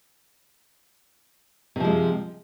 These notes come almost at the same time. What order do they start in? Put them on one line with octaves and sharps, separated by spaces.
C3 F3 G#3